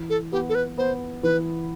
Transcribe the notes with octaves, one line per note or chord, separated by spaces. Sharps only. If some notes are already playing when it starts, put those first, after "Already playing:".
Already playing: E3
A4
B3 G4
A4
B4
B3 C5
E3 B4